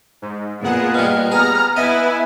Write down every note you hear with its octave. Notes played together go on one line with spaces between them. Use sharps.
G#2
A#2 B3 G#4 F#5
B2 G3 F6
B3 G#4 A#5
B3 E4 B4 D#5 E5 G#5